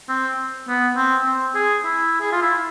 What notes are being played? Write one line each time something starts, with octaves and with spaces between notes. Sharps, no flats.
C4
B3
C4
C4
G#4
E4
G#4
F4
E4